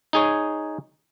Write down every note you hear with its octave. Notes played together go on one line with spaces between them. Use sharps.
D#4 G#4 C#5